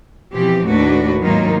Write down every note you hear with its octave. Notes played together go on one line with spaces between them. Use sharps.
B2 E3 F3 C4 G4
D#2 A2 A3 D4 F#4 B4
G#2 D#3 F#3 A#3 D#4 F4